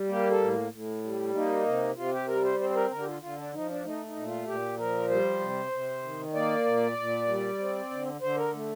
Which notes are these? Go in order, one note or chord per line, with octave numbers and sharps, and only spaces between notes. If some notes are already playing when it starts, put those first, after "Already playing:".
Already playing: G3
A#3 G4
A4
A2
A2
G3
A#3 D#4
C3
C3 F4
G4
G3 A#4
C5
C4 C5
C5
A#4
D3 A#4
G4
F4
D3 F4
D4
F3 D#4
D4
A3 D#4
D#4
A#2
F4
A#2 G4
F3 A#4
G3 C5
C3
C3
D#3
A#3 D5
A#2
A#2
G3
C4
D3
D3 C5
A#4
A3